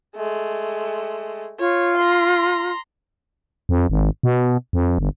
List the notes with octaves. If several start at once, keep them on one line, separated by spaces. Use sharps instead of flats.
G#3 A3
F4 C#5
A#5 C6
F2
G#1
B2
F2
G1